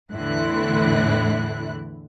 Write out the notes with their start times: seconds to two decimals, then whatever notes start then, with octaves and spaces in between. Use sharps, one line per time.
0.13 E2 A2 D3 E3 E4 F#6